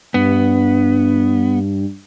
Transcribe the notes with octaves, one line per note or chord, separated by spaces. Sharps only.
G2 B3